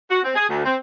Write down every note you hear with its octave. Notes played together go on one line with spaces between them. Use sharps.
F#4
C4
G#4
D2
C4